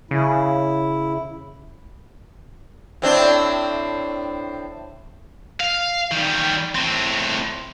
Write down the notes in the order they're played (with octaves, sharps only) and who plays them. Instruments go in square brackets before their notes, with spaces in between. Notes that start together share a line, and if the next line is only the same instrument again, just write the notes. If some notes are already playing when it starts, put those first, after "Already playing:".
[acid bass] C#3 [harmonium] E4
[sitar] A2 C4 D4
[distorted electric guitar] F5
D#3 G3
A2 C4